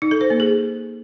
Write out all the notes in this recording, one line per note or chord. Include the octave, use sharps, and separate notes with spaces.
D#4
A4
C5
A#3
G#4